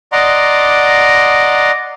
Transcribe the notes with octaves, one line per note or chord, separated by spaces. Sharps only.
D5 D#5 F#5 A#5 C6 D6